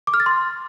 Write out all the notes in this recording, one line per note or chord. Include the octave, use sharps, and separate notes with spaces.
D6
F6
A6
C6